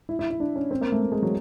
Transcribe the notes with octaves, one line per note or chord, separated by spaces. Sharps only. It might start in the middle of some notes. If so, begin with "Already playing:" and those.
E4
E4
E4
D4
C#4
C4
A#3
A3
A3
G#3
F#3